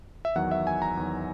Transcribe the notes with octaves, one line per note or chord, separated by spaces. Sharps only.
E5
E2 D#3 F#3 F#5
E5
G#5
A#5
E2 D#3 F#3